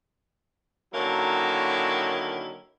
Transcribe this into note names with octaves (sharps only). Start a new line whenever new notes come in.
D3 D#3 F#3 A#3 C#4 E4